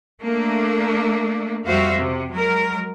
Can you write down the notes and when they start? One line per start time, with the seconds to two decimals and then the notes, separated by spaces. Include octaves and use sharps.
0.22 A3 A#3 D4
1.66 F2 G3 F#4 C5 E5 F5
1.97 C3
2.31 F#3 G#3 A#4